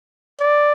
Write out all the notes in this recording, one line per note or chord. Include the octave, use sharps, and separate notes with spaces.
D5